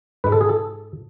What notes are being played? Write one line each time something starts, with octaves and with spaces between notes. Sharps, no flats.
G#2 G#3 B4
A4
G#4
A4